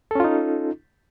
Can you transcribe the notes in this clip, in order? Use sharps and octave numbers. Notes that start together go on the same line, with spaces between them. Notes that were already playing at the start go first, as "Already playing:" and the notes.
C#4 D#4 F4 A4